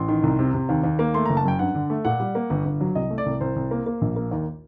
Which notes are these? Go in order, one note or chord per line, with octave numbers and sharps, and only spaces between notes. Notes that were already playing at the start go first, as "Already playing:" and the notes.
Already playing: A1 C6
D#3
C2
C3
C3
D#2
D#2
A#3
A3 C6
A#5
F#1
A5
F#2 G5
G2 F#5
D3
A3
A#2 F#5
G3
A#3
G1
G1
F#3
C2 D#5
A3
D5
C2
C2 C5
C2
A#3
A#3
A#1
A#3
D#2